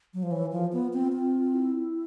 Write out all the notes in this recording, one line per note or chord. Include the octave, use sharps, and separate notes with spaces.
F#3
F3
C5
E3 C#5
B4
F3
F4
B3
C4
C4
E4